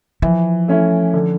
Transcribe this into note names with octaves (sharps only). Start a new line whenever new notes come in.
E3 F3
A3 C#4 E4
D3